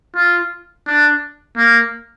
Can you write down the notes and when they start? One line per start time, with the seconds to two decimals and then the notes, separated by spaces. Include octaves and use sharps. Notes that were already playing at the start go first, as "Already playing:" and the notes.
0.15 F4
0.87 D4
1.57 A#3